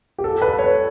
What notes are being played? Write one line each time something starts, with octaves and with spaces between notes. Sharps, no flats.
G4
A4
B4
C#5